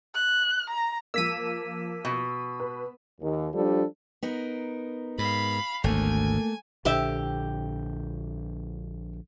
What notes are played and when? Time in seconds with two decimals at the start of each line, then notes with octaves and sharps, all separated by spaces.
0.15 F#6
0.70 A#5
1.14 F3 A#3 E6 B6 D#7
2.05 B2
2.60 B4
3.21 D#2
3.54 F3 G3 D4 A4
4.23 B3 D#4 A#4
5.18 G#2 F5 B5
5.84 G#1 D2 A3 A#3 G#5
6.85 A#1 D3 G4 E5